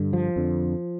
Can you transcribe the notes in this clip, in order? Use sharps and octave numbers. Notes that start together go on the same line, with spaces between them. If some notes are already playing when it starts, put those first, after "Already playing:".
Already playing: G2 D3
F3
F2 D3